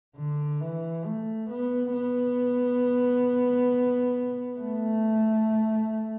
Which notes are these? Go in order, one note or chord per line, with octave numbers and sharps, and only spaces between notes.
D3
E3
A3
B3
B3
A3